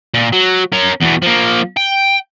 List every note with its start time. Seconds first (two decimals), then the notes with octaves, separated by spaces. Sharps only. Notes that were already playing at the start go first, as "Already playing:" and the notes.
0.14 A#2
0.33 F#3
0.73 C#4 A#4
1.02 E2 B2
1.23 F3 A#3
1.77 G5